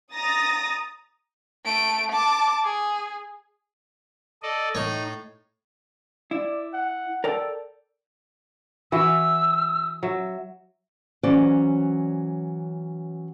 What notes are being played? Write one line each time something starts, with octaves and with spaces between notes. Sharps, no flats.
A#5 D#6 A6 A#6
A3 D7
A5 D6
G#4
A4 D5 D#5
A2 D#4 C#5
E4 D5
F#5
A4 A#4 D5 G5
E3 F#4 E6
F#3 E5
E3 F#3 C#4 C5 D5